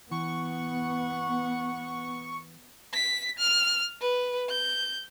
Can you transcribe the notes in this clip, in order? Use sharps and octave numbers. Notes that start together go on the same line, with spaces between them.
E3 B3 F#5 C#6
B6
F6
B4
G6